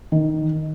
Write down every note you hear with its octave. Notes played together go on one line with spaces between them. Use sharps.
D#3